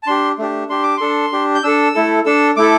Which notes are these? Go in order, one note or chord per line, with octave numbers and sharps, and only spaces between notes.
A5
D4 G4 C6
A3 D4 G4
D4 G4 C6
D6
D4 A4 C6
D4 G4
G6
D4 A4 E6
A3 E4 A4
D4 A4 E6
A3 E4 A4 D6